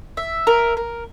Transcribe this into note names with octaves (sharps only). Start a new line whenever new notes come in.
E5
A#4
A#4